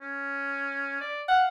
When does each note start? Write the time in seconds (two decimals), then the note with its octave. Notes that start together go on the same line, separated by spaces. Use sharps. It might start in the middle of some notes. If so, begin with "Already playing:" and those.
0.01 C#4
1.01 D5
1.28 F5 F#5